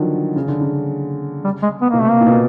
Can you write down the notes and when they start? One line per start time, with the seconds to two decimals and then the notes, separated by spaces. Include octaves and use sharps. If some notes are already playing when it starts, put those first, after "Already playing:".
Already playing: D3 D#3 F3 F#3
0.36 C#3
0.48 D3
0.61 C#3
1.44 G3
1.63 G#3
1.82 B3
1.90 B2 A#3
1.99 C3 A3
2.10 A#3
2.21 A#2
2.27 B2